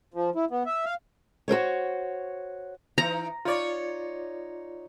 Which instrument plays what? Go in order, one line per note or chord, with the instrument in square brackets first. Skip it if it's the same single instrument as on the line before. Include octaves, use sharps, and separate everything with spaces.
[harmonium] F3
E4
B3
E5
F5
[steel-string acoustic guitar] F#4 A#4 C5 C#5
[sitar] E3 D#4 [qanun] A#5
[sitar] D#4 C#5 [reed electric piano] F4 D5